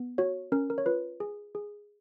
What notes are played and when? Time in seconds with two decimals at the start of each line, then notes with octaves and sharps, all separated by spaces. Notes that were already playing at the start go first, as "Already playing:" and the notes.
Already playing: B3
0.18 F#4 C#5
0.52 C#4 A#4
0.70 A#4
0.78 C#5
0.86 F4 B4
1.20 G#4
1.55 G#4